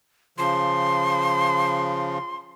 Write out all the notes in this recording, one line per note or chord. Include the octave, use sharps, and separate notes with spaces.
C#3 F3 C6